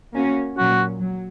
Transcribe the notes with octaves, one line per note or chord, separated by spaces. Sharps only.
A#3 C#4 F#4
A#2 F#3 C#4 F#4
F#3